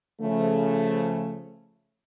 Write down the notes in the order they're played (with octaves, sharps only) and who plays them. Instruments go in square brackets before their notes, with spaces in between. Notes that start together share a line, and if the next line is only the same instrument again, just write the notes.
[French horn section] C#3 F3 A3